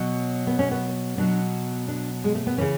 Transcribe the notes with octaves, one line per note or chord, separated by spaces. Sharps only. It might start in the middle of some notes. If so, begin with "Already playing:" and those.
Already playing: B2 F#3
B3
C#4
B3
B2 F#3 D4
D4
G#3
A3
B3
C#3 E3 C#4